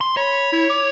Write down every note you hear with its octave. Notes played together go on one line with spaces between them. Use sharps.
C6
C#5 B5
E4
D6